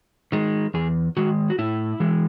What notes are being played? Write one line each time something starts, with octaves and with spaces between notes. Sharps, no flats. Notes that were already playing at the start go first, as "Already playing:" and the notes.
D#3 G#3
E2 G#4
D#3 G#3 F#4
F#4
A2 E4
E3 G#3